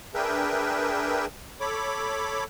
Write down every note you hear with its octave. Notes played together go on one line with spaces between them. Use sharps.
D4 G#4 A#4 B4 E5 G5
A4 C#5 B5 D6